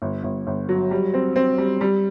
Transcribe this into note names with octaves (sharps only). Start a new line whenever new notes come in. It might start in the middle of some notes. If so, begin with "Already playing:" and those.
G1
G1
G1
F#3
G3
C4
C4
G3
G3